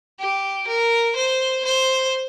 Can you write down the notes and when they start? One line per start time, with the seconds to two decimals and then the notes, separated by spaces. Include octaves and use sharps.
0.19 G4
0.67 A#4
1.16 C5
1.65 C5